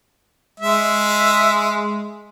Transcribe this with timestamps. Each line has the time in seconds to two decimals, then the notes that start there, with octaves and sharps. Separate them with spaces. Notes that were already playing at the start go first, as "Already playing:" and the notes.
0.60 G#3 E5